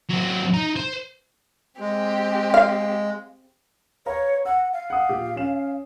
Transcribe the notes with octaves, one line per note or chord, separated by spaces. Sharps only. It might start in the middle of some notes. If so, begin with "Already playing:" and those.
F#3 C4
D#4 A#5
C5
G#3 C4 G4 G#4
F5
B4 C#5 F5 A#5
F#5 E6
F5
F#5 D#6
A#2 G4
C#4 E7